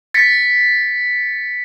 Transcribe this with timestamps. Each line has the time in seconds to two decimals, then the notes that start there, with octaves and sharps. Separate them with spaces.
0.14 A6 B6 C#7